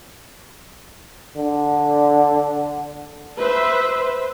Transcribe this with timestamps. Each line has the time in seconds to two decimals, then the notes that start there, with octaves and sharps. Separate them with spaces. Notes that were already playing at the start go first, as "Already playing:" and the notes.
1.37 D3
3.37 B4 C5 E5